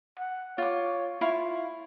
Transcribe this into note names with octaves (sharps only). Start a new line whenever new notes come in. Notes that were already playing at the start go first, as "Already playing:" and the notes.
F#5
F4 C#5 D6
E4 F4 F5 C#6